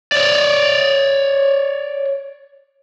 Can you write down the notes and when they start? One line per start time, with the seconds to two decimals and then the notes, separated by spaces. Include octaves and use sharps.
0.12 C#5 D5